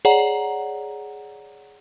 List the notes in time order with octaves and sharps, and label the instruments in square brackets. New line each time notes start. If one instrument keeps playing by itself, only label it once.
[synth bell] G#4 C#5 D5 F#5 A#5